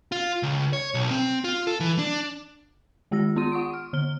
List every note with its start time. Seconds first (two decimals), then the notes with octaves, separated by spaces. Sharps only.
0.12 F4
0.43 C#2
0.73 C#5
0.94 B1
1.11 C4
1.44 F4
1.67 A4
1.80 E3
1.99 D4
3.11 D#3 G#3 G4 E6 A#6
3.36 B3 F4 C6 D#7
3.52 F#5 C#6 D#6 D7
3.74 F6
3.93 D3 F6 G7